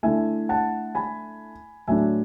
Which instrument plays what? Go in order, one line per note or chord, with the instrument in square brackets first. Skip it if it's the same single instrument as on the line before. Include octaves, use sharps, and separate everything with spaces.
[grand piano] D3 A3 E4 E5 G#5
F#5 A5
G#5 B5
A2 F#3 A3 D4 E5 G#5